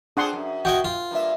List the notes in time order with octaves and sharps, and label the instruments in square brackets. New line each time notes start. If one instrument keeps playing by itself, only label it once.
[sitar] C4 F4 G#4 [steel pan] D4 F#5 C6
[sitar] F#2
[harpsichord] F#4 D#5 G#5 [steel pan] G5
[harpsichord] F4
[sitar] G2 A#3 E5